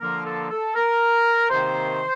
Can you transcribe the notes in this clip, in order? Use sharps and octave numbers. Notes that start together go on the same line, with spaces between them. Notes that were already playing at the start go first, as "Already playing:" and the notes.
D3 F3 A#3 A#4
A4
A4
A#4
C3 D#3 A#3 C5